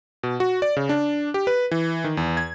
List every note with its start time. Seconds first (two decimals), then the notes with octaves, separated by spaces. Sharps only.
0.23 B2
0.40 F#4
0.62 D5
0.76 C#3
0.89 D4
1.34 G4
1.47 B4
1.71 E3
2.04 D#3
2.17 E2
2.37 G#6